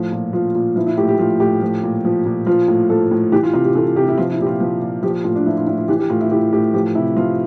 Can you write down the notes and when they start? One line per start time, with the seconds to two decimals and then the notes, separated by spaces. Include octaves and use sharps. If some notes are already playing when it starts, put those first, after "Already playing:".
Already playing: A2 F3
0.12 A#2
0.33 F3 F4
0.55 A#2
0.76 F3 E4
0.87 E4
0.97 A2 G4
1.09 G4
1.18 F3 F4
1.40 A2 G4
1.61 F3
1.83 A#2
2.05 F3
2.26 A#2
2.47 F3 F4
2.68 A2
2.90 F3 A4
3.11 A2
3.32 E3 G4
3.43 F4
3.54 C3 F4
3.65 G4
3.75 E3 A4
3.96 C3 G4
4.08 E4
4.18 F3 F4
4.32 E4
4.39 A#2 G4
4.47 F4
4.60 F3
4.82 A#2
5.03 F3 G4
5.24 A2 F4
5.36 D4
5.46 F3 E4
5.57 F4
5.67 A2 E4
5.78 F4
5.88 E3 G4
5.99 G4
6.10 A2 F4
6.21 E4
6.31 E3 G4
6.53 A2 G4
6.74 F3 G4
6.95 C3 E4
7.17 F3 F4